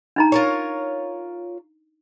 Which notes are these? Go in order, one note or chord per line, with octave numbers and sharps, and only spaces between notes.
D4 D#4 A#5
F4 A#4 C#5